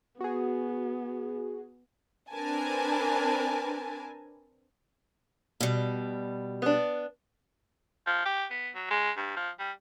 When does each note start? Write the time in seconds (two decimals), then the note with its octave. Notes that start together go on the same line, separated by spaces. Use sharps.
0.21 B3 F#4 G#4
2.31 C4 D4 A#4 B4 G#5 A5
5.61 B2 G3
6.62 B3 D4
8.07 F3
8.25 G4
8.50 B3
8.75 F#3
8.90 G#3
9.17 G2
9.36 F3
9.59 G3